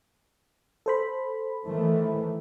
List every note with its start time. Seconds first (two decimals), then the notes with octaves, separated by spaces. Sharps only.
0.86 A4 C5 B5
1.66 D#3 E3 A3